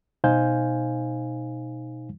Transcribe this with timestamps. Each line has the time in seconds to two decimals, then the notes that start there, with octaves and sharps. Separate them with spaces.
0.24 B2 D#4 C5 F5 G#5 G6